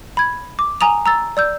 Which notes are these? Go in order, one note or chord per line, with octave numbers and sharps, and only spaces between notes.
B5 G#6
D6
G#5 A#5 D#6 F7
A#5 E6 A6
D5 E6 G6